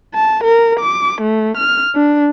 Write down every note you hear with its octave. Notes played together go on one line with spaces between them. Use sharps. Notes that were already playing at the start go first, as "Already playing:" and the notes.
A5
A#4
D6
A3
F6
D4